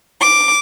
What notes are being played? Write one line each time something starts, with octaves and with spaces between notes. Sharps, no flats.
D6